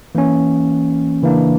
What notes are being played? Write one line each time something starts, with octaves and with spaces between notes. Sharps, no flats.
E3 A#3 C#4
C#3 E3 A#3 D4